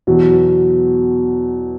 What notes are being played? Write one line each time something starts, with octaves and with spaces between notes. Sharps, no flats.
E2 B2 F#3